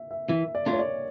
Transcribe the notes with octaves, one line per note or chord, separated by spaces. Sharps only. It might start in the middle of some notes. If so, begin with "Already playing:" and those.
Already playing: E5
E5
E3 E5
D5
A3 D4 F4
C#5
D5